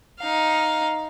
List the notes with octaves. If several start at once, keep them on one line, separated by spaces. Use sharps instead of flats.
D#4 F5